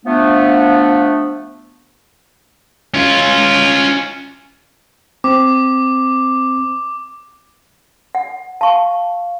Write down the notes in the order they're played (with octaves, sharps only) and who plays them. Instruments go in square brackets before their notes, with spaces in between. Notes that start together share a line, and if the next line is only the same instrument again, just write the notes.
[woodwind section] F3 A3 B3 D4
[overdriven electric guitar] C#4 F4
[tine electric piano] C4 [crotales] D6
[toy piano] F#5
[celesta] F5 [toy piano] A5 C#6